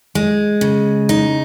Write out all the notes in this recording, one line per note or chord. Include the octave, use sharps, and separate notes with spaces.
G#3
C#3
D#4